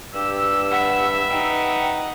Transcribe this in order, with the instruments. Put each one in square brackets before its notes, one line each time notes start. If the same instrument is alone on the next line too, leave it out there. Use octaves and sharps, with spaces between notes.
[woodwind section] G2 E6 [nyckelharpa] G4
[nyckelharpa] B4 E5 [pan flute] F#5
[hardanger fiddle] D#4 F#5 [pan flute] G5